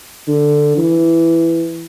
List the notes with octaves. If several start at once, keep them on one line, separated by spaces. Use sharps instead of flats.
D3
E3